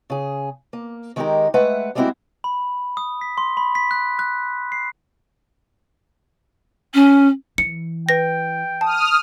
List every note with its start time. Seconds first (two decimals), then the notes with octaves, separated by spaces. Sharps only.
0.10 C#3 G#4
0.73 A#3
1.16 D#3 G#3 D#4 F#4 G4 A#4
1.54 G#3 A3 B4 E5 F#5
1.95 G3 G#3 A#3 C4 E4 F#4
2.44 B5
2.97 D#6
3.21 B6
3.38 C6
3.57 B5
3.75 B6
3.91 F#6
4.19 F#6
4.72 C7
6.94 C#4
7.58 E3 C#7
8.09 B4 G5 A#6
8.81 A5 D#6 F6